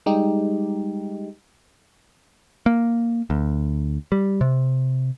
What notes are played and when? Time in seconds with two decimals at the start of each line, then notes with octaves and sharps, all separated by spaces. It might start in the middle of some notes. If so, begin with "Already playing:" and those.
0.06 G3 G#3 D#4 G4
2.66 A#3
3.30 D2
4.12 G3
4.41 C3